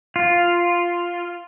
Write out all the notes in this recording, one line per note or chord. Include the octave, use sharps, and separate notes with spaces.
F4